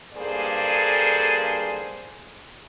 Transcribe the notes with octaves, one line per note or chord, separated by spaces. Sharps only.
G2 A#3 G#4 A4 C5 D5